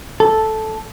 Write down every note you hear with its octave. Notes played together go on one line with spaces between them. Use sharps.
A4